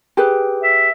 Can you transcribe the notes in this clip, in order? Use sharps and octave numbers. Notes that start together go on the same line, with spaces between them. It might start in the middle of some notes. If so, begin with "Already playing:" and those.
G4 G#4 B4
E5